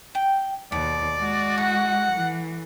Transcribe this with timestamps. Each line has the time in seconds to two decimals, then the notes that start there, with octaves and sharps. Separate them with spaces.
0.15 G5
0.72 D#2 B2 D5
1.18 G#3 F#4
1.58 A2 F#5
2.12 E3